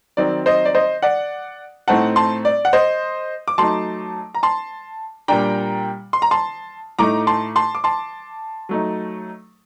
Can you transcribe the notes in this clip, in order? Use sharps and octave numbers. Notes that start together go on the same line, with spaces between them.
D#3 F#3 C4 D#4 D5
C5 D#5
D5
C5 D#5
D5 F#5
A2 A3 C4 D#4 F#5 A5
A5 C6
D5
F#5
C5 D#5
D6
F#3 A3 D#4 A5 C6
A#5
A5 C6
A#2 G3 D4 G5 A#5
C6
A#5
A5 C6
A2 A3 D#4 A#5 D6
A5 C6
A5 C6
D6
A5 C6
F#3 A3 D#4